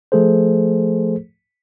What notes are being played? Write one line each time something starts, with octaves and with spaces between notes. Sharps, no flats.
F3 A3 G#4 A4 C5